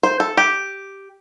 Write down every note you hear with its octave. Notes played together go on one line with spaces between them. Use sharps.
C5
A4
G4